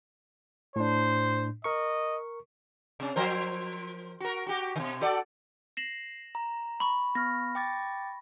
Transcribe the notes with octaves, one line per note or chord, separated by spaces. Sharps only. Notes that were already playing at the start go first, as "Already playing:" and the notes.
A2 D4 C5
A#4 D#5 C#6
C3 C#4
F3 A#4 C5
F#4 A#4
F#4 G4
B2 D3
F#4 A4 D5
A#6 C7 E7 F#7
A#5
B5 C#6
B3 F6 A#6
G5 D6 A6